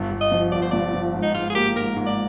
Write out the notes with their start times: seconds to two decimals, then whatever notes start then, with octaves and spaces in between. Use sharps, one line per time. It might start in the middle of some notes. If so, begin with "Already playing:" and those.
Already playing: G1 G2
0.11 G1
0.21 D#5
0.32 F3
0.52 G1 D5
0.62 C5
0.71 G2 D5
0.93 F3
1.14 G#2
1.22 D#4
1.34 G#2 F4
1.50 G#4
1.55 A#3 G4
1.75 G#2 A#4
1.96 G#2
2.06 D5